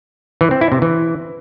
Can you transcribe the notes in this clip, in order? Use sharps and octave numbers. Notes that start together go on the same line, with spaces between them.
E3
C4
E4
C3
E3